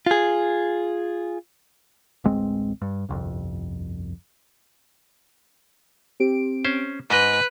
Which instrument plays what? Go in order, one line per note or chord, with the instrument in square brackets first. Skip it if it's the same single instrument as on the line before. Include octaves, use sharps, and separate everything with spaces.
[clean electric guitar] F4 G#4
[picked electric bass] D1 A1 G#3 C4
G2
G1 C2 F2
[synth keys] C4 G4 D7
[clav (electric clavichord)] C#4 C5
[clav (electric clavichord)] G#2 D#5 [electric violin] B4 [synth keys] B6